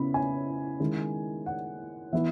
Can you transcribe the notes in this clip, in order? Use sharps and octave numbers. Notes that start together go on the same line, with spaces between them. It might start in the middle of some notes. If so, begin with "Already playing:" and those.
Already playing: C#3 B3 E4 B5
G#5
D#3 G#3 C#4 E4
F#5
E3 B3 E4 E5